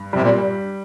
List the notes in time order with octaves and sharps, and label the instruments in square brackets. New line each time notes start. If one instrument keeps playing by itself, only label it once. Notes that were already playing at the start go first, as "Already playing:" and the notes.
Already playing: [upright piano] G2
[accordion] C3 [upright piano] G3
[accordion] A#2